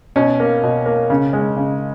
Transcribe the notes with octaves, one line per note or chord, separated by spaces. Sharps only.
B2 C#4
A#3
B2
A#3
C#3
G#3
C#3